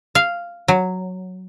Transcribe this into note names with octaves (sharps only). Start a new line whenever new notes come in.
F5
F#3